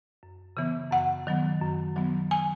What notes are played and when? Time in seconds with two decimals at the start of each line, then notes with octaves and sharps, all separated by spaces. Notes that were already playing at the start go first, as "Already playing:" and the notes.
0.23 F#2
0.57 C#3 E3 B3
0.91 F#2 F#5
1.27 D#3 F#3 B3
1.61 F#2
1.96 D#3 F#3 B3
2.31 G#5